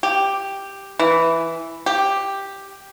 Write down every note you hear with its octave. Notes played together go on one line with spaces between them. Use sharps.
G4
E3
G4